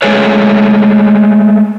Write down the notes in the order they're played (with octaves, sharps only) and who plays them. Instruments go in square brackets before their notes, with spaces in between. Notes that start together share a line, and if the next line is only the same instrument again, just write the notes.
[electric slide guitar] G#3 A3 G#4 B4 C#5